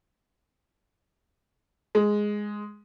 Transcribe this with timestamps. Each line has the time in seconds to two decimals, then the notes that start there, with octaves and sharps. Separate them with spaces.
1.95 G#3